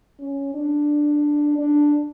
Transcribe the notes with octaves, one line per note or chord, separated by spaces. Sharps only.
C#4
D4
D4